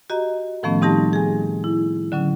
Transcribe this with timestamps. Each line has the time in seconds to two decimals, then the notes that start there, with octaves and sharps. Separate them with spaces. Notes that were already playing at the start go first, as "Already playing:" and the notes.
0.10 F#4 G4 D#5 A#5
0.63 A2 D#3 F3 A3 B3 C#4
0.81 G3 C4 D#4 G4 A5 A#6
1.13 G#4 G#5
1.64 E4
2.12 D3 F#3 C#4